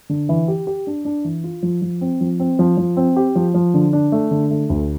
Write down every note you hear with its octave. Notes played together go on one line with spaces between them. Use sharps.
D3
E3
G4
G4
D4
D4
E3
F4
F3
F3
C4
F3
C4
F3
F3
C4
G4
F3
F3
D3
D4
A3
D3
A3
D2